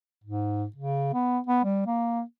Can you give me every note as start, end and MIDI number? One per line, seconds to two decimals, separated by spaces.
0.24 0.65 44
0.76 1.10 49
1.14 1.39 59
1.47 1.61 59
1.64 1.85 55
1.86 2.22 58